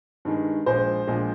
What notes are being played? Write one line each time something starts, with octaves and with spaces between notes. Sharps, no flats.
G2 D#3 G#3
A#1 A#2 G#3 C5
A#1 A#2 G#3